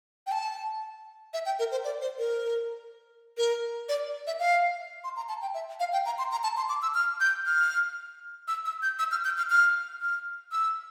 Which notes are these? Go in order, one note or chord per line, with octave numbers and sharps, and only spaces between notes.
G5
A5
E5
G5
A#4
C5
D5
C5
A#4
A#4
D5
E5
F5
C6
A#5
A5
G5
E5
F5
G5
A#5
C6
A#5
A5
C6
D6
E6
F6
G6
F6
E6
E6
G6
E6
F6
G6
F6
F6
F6
E6